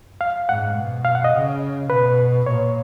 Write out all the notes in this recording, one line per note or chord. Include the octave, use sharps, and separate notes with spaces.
F5
G#2 F#5
B2
F5
F#5
D#5
C#3
B2 B4
A#2 C#5